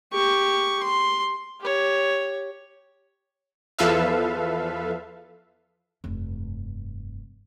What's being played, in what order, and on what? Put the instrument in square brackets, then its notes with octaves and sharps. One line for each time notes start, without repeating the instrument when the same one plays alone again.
[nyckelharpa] G4 C#6
C6
G4 C#5
[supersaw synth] E2 F3 A4 B4 E5 F5
[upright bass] F1 G2